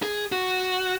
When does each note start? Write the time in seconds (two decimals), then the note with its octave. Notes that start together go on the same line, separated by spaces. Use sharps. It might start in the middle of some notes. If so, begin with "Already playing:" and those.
0.03 G#4
0.32 F#4